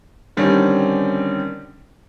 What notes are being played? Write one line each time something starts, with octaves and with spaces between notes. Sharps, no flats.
D3 D#3 G3 C4 C#4